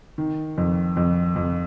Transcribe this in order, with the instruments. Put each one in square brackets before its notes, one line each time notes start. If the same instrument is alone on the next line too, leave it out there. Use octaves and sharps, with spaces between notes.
[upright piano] D#3
F2
F2
F2